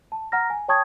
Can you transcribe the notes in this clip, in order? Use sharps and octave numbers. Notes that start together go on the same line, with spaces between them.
A5
F#5 A#5 F6 A#6
G#5
C#5 G5 A5 C#6 D#6 G#6